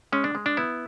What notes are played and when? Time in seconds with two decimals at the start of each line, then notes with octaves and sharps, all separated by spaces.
0.12 G#3 C#4
0.24 D4
0.35 G#3
0.46 D4
0.57 B3 E4